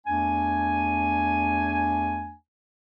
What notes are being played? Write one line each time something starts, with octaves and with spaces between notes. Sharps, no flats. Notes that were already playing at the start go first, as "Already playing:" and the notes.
E2 A3 D4 G#5